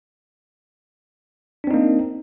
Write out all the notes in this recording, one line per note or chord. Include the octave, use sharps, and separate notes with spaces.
A#3 C4 D4 D#4